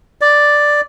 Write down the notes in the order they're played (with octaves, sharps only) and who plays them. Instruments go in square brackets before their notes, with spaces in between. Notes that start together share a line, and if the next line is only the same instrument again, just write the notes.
[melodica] D5